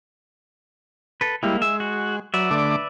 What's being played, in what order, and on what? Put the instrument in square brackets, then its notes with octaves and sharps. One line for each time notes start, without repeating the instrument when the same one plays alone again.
[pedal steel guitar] A4 B4
[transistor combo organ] G3 E4 [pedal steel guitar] G#3 A#3
[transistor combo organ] G#3 [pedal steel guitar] E5
[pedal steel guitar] F#4
[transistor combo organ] F#3 [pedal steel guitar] B4 D5 E5
[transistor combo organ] D3 A3 D6